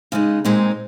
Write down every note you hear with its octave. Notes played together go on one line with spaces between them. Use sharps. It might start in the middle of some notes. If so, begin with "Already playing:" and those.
C#3 G#3 D#4
A#2 G#3 C4 D#4